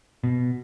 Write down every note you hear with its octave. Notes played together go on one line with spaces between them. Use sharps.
B2